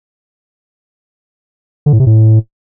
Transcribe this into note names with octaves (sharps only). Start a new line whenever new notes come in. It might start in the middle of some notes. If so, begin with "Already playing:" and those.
D3
A2
C3
A2